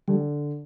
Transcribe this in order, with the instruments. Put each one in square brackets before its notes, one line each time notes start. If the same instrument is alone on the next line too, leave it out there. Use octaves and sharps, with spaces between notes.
[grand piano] D3 [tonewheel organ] G3